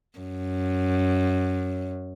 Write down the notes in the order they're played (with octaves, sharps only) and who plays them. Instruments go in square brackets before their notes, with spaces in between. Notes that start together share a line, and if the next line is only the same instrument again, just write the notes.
[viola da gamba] F#2